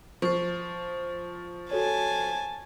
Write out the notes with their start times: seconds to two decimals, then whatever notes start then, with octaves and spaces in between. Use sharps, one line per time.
0.22 F3 C5 C#6
1.71 F#4 A4 C#5 G#5 A5